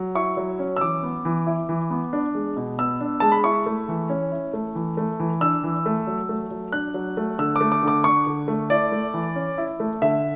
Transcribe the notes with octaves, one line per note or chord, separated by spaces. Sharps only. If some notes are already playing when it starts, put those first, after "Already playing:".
Already playing: F#3
E4 C#6
F#3
C#4
E6
E3 D6
B3
E3
E4
E3
B3
D4
G#3
B2
B3 E6
D4
G#3 A5
B5
E4 C#6
A3
E3
C#4
E4
A3
E3
A3
E3
D4 E6
E3
A3
F#3
A3
F#3
D4 F#6
F#3
A3
D3 E6
D6
A3
D6
D3
D6
D4 C#6
D3
A3
E4 D5
A3
E3
C#4
E4
A3
D3 E5